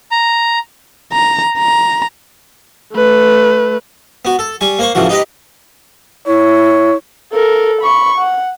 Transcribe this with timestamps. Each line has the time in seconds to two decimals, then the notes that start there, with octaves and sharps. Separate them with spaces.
0.11 A#5
1.13 A#5
1.58 A#5
2.94 A3 B4
4.25 B3 F#4
4.39 A4
4.61 G3 G#5 C#6
4.79 A#3 C5 C#6
4.95 A2 C#3 E3 F3 F#4
5.09 D#4 G4 B4 D#5
6.27 E4 C#5
7.33 A4 A#4
7.82 B5 C#6
8.18 F#5